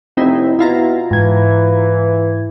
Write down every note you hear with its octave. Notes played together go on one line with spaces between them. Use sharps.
F1 C4 D#4 E4
B2 E4 F4 A#5
G#2 E3 G#6